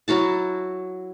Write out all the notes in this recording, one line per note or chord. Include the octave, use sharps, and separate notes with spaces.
F#3 E4 F#4 A5